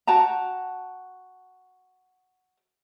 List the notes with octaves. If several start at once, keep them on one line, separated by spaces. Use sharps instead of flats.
F#4 G5 A5 A#5